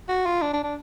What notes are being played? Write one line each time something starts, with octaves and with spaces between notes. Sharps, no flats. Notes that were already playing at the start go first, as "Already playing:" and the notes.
F#4
F4
D4
D4
D4